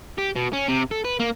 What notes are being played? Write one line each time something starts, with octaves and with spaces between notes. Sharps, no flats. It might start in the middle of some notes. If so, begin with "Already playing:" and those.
G4
B2
C#4
C3
A4
B4
A#3